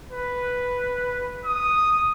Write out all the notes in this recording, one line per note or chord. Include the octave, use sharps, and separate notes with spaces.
B4
D#6